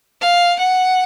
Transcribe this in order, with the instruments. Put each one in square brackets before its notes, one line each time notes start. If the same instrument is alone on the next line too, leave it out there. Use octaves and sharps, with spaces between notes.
[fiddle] F5
F#5